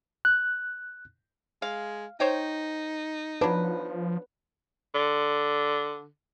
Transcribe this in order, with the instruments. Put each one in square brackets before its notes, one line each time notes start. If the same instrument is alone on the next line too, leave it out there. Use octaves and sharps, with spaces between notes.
[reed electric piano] F#6
[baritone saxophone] G#3 [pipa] F5
[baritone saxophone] D#4 [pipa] C5 C#5 G5
[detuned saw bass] F3 [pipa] F#3 D4 [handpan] B4
[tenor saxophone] D3